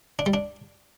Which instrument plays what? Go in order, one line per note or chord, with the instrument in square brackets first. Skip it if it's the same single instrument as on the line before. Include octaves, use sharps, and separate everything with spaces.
[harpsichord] D4
G3
D4